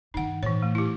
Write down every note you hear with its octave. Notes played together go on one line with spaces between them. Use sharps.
G2 D#3 D#4 F#5
A2 E3 C#5
A3
E4 G4